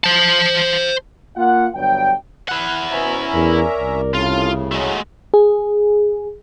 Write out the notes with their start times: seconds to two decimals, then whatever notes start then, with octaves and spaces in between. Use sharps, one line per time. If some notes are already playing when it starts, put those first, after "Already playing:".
0.04 C5 A5
1.36 A#3 F4 F#5
1.74 G1 G2 F#3 G5
2.49 E4 F#5 F#6
2.91 B2 C#4 B4 C5 E5 A#5
3.33 E2 A#4 D5
3.78 C2
4.14 A2 C#3 C#4 F4 A4
4.72 F#3 G#3 A3
5.34 G#4